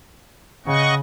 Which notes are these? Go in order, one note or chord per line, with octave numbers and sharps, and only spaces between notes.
C#3 D#5 F#5 C#6